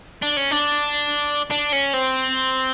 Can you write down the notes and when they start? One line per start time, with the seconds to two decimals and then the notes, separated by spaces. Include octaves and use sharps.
0.22 D4
0.37 C#4
0.51 D4
1.51 D4
1.73 C#4
1.94 C4